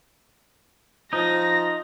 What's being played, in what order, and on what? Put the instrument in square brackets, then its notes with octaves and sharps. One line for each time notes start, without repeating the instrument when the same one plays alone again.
[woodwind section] F3 [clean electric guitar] D#4 [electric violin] A#6